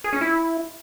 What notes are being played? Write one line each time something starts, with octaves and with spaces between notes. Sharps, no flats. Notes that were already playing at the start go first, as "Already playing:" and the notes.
G#4
C#4
E4